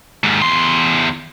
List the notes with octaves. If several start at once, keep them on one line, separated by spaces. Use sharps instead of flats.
D#2 G#2
E2 C6